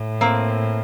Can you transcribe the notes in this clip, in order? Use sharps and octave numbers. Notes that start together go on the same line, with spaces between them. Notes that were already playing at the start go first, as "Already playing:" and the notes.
Already playing: A2
A#3 C4